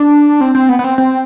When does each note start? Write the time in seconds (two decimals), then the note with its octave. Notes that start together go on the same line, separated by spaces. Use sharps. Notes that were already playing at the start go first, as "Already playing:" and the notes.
Already playing: D4
0.41 C4
0.55 C4
0.69 B3
0.79 B3
0.84 C4
0.98 C4